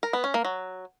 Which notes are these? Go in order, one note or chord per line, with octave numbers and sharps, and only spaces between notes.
A#4
B3
C#4
A#3
F#3